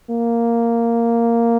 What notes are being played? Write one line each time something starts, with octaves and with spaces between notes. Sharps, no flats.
A#3